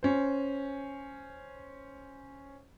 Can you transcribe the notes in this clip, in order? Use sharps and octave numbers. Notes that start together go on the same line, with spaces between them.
C#4 C5